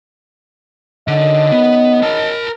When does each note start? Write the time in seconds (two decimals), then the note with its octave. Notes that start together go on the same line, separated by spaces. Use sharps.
1.08 F#2 D3 D#3 D#5
1.52 B3
2.03 A#4 A5